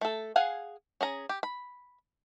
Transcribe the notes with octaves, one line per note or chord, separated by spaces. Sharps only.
A3 A4
G#4 F5 F#5 G#5
C#4 G#4 A#5
G4
B5